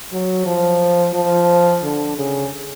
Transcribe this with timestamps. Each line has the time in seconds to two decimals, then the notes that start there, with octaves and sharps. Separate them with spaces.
0.12 F#3
0.46 F3
1.13 F3
1.82 D3
2.17 C#3